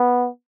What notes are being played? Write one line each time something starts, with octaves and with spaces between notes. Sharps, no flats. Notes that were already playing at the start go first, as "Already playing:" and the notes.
Already playing: B3